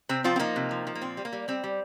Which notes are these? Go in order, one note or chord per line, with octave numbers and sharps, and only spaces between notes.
C3 C4
F3 C4 F4
C4
F3 A#3 D#4
C3
F3
F3
A#3
A#2 C4
G3
A#3
G3
G3 C4
G3